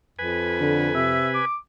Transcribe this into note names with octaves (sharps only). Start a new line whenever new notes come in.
F2 B4 G#5
D3
C3 E5
D6